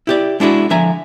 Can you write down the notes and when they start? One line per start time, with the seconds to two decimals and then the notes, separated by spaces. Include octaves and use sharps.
0.07 E4 G4 D5
0.40 G#3 D4 E4 F#4 G#4
0.70 D3 F3 E5 G#5 A#5